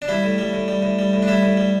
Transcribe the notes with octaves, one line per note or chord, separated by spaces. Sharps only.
D4
G3 E4
A2
G3
A2
G3
A2
G3
A2
D4
G3 E4
A2
G3